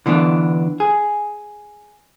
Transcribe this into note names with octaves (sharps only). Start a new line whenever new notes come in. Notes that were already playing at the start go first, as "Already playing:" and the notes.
D3 E3 B3 D4
G#4